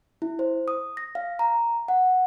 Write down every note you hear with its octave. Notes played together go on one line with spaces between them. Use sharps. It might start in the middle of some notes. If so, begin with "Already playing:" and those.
E4
C5
D#6
A#6
F5
A#5
F#5